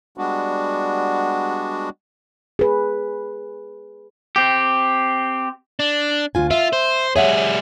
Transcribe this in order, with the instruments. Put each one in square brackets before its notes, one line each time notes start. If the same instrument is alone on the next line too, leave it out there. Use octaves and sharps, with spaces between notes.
[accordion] G3 G#3 B3 D4 F#4
[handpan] G#4 B4
[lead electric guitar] C4 G4
[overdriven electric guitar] D4
[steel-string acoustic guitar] D2 F4 G#5
[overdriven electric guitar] F4 [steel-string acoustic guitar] E5
[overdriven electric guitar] C5
[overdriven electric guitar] G3 G#4 [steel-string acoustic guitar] C#5 E5 F#5